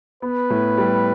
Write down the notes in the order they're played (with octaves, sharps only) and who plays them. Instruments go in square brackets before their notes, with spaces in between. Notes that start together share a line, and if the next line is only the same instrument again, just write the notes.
[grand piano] B3 [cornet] B4
[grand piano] A2
G3